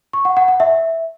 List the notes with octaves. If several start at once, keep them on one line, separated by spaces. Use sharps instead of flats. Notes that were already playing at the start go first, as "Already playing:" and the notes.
C#6
F#5
F#5
F#5
E5